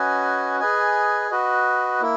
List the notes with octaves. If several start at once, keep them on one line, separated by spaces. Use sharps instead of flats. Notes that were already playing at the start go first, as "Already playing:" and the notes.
Already playing: C#4 F#4 B4 D#5 G#5
G#4 B4 D#5 G#5
F#4 B4 D#5
A#3 E4